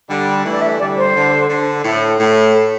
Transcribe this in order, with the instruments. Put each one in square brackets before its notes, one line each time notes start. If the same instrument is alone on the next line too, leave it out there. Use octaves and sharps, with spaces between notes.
[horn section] D3 G3
E3 A3
[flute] D5
E5
[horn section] D3 G3 [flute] D5
[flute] C5
[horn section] D3
D3
A2
A2
[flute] A4